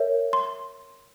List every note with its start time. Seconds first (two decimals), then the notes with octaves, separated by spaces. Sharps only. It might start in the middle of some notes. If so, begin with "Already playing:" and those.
Already playing: A#4 C#5 E5
0.33 C6